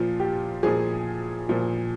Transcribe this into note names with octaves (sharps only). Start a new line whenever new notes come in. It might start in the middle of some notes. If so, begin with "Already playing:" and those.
Already playing: A#2 F3 F4
G4
A#2 F3 G#4
A#2 F3